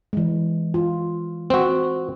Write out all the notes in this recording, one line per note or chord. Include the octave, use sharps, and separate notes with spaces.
E3 G#3
F4
C4 F#4